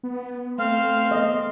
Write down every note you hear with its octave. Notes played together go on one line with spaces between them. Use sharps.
B3
A3 C4 F5
B3 D#5